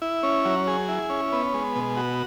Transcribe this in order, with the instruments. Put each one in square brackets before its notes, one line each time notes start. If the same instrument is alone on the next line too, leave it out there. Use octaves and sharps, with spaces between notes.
[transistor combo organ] E4
C#4
F#3
G#4
E4
C#4
B3
G#3
B2
F#4